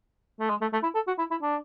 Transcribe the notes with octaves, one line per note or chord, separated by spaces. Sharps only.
A3
G#3
A3
A3
E4
A4
F#4
E4
E4
D4